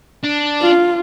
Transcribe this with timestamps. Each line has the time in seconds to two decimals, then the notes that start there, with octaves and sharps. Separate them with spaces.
0.24 D4
0.62 F4